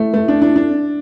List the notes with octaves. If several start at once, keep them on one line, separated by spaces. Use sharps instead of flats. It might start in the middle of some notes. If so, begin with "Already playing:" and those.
Already playing: A3
A3
D4
D4
D4